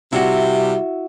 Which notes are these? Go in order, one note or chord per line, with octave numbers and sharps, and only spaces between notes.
C3 G3 E4 F#4